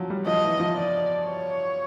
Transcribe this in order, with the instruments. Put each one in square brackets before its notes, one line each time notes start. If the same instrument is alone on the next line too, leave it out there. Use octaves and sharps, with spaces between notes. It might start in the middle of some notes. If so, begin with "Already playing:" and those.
Already playing: [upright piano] F3 F#3
G3
[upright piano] F3 [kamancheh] D#5
[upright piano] E3
F3
[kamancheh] D5
C#5